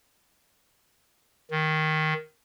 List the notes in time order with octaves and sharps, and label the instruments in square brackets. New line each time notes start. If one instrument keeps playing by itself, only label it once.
[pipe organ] D#3